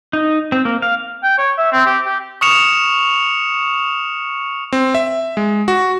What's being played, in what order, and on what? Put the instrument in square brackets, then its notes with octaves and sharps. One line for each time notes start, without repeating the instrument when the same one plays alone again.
[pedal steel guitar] D#4
C4
A#3
F5
[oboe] G5
C#5
E5
C4
G4
G4
[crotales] C#6 D#6 F6 C#7 E7 F7
[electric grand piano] C4
E5
G#3
F#4